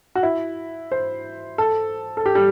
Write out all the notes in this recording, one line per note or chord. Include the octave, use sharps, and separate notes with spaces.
F#4
E4
C5
A4
A4
G4
G3